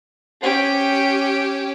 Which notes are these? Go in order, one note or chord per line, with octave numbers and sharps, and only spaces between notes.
C#4 G4